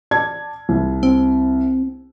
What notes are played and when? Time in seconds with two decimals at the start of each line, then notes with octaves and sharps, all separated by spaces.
0.11 D5 A5 G#6
0.69 C2
1.03 C4